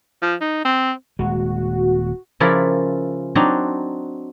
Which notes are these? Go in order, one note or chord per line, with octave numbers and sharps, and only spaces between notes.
F3
D#4
C4
D#1 G#3 F#4
C#3 F3 E4 A#4 D5 B5
F#3 C4 D4 D#4